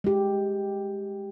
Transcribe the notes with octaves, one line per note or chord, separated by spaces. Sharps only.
G#3 G4